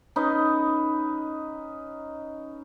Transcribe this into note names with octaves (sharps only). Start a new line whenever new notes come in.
C#4 D#4 B4 D#5